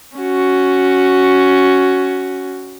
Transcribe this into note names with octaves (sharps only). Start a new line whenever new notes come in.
C#4 F#4